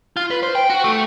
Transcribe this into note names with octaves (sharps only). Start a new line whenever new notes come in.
F4
B4
C5
G5
F#4
A3